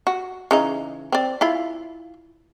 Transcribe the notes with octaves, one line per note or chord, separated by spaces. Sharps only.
F#4
C#3 E3 D#4
C4 D5
E4 F4 B5